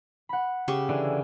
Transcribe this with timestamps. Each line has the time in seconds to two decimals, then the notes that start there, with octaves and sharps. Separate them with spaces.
0.29 F#5 B5
0.68 C#3 G4 C#6
0.89 D3 E3 D4